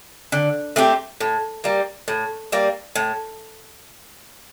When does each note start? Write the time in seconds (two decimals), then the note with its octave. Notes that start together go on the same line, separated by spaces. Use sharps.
0.32 D3
0.76 A3 C4 G4
1.21 A2
1.64 G3 A#3
2.08 A2
2.52 G3 A#3
2.96 A2